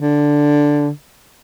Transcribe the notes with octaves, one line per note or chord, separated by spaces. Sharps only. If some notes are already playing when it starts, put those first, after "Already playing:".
D3